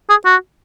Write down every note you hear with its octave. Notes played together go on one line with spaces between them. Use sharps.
G#4
F#4